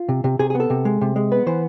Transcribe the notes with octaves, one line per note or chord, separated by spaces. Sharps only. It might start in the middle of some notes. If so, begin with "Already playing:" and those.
Already playing: F4
C3
C3
C3 G#4
G#4
B3
A4
C3
G#3
C3
G#3
B3 B4
E3 C5